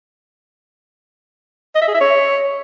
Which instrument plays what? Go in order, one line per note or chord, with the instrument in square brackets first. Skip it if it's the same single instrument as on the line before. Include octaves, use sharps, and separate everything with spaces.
[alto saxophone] D#5
E5
G#4
E5
C#5